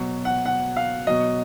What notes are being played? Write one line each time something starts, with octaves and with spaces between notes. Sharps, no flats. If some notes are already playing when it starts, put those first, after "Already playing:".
Already playing: B2 F#3
F#5
F#5
F5
B2 F#3 D#5